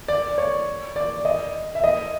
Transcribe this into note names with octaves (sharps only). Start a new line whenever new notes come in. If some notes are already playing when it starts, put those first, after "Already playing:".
D5
C#5
D5
D#5
E5
D#5